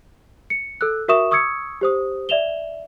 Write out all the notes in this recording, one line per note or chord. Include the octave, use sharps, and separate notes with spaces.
C#7
A4 E6 F#6
F#4 A#4 E5 C#6 D#6 E7
C#6 D#6 E6 G#6 C#7
G4 C5 D#6
D5 E5 E7 F7 G7